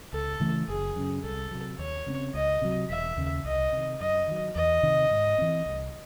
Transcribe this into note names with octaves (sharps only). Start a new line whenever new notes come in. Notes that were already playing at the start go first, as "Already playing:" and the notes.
C#2 A4
C#3 E3 A3
F#1 G#4
F#2 C#3
C2 A4
C3 F#3
D#2 C#5
C#3 F#3 C4
C#2 D#5
C3 F#3
E1 E5
D#2 C#3
C2 D#5
C3 D#3
F#2 D#5
D#3 F#3
E2 D#5
C3 D#3
G#2
E3 C4
C2